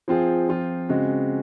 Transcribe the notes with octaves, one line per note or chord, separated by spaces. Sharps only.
F3 C4 F4 G#4
F3 C4 F4
C#3 G#3 C4 F#4